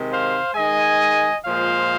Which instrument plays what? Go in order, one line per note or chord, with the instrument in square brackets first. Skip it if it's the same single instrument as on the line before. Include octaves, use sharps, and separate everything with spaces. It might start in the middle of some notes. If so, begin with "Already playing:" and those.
Already playing: [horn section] C3 D#3 G#3
C5 F5
D#3 G#3 D#5 G#5
A#2 F3 G#3 C5 F5